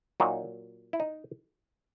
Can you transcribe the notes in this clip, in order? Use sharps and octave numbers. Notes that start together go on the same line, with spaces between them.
A#2 F#3 D#4
E4
D#4